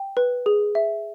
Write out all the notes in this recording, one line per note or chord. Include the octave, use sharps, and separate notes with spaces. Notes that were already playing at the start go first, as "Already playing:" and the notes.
Already playing: G5
B4
G#4
E5